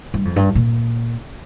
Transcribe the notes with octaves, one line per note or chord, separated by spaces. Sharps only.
G2
F2
G2
A#2